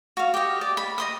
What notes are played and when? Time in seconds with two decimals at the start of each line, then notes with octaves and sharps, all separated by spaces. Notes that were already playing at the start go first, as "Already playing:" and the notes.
0.17 F#4 F5
0.34 G4 D#5
0.61 D5
0.77 B5
0.98 D#5 C6 D#6